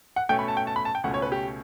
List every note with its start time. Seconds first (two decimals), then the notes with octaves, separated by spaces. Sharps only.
0.16 F#5
0.29 B2 A3 C#4 G5
0.39 B5
0.48 A5
0.57 G5
0.67 A5
0.76 B5
0.85 A5
0.95 G5
1.04 C#2 B2 A3 C#4 F#5
1.14 C#5
1.22 B4
1.32 G4